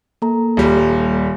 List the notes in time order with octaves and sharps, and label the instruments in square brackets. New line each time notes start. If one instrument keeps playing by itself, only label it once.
[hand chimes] A#3 A4 A#5
[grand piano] D#1 G3